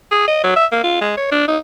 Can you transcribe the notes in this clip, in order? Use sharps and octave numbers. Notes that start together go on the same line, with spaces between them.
G#4
D#5
F#3
E5
A#3
F4
G#3
C#5
D4
D#4